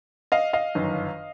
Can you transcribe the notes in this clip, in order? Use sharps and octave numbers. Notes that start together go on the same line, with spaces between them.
D#5 F5
D#5 F5
G1 F#2 D#3